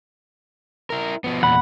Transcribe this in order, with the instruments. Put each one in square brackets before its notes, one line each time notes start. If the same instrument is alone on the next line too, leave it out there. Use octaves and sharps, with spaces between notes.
[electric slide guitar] E4 A#4
B2 F3 B3
[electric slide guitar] E2 A#2 [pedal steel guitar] F#5 B5